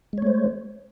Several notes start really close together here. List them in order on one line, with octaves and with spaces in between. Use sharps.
G#3 C#5 A3 C5